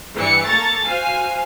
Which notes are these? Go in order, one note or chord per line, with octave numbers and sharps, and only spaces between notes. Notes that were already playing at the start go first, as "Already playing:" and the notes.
G2 E3 G3 C#7
A#3 A4 A#5 C#6 A6
F#4 C5 F5 G#5